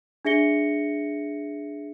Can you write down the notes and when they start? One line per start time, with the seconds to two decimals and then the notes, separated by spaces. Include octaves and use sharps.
0.25 D4 G#4 E5 A#6 C#7 G7